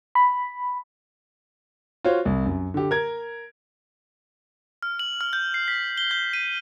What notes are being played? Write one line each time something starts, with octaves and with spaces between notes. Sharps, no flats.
B5
F4 F#4 C5 C#5
C2
F#2
D3 G4
A#4 G#6
F6
F#7
F6
G6
C7
B6
G7
G6
D#7